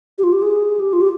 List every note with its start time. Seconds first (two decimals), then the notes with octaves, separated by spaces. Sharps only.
0.18 G4
0.24 F4
0.32 G4
0.42 G#4
0.80 G4
0.93 F4
1.01 G4